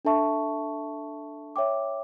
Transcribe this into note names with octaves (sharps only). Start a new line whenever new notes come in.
D4 A4 E5 A5 C#6
C#5 E5 G5 D6